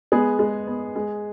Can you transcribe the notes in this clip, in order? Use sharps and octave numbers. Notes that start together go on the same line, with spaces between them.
G#3 B3 G#4
G#3
B3
G#3